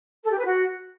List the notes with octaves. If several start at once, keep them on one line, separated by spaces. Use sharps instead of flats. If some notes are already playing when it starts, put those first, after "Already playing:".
A4
G4
B4
F#4